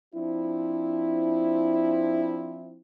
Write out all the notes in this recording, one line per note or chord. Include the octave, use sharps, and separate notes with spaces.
F3 C4 D4 E4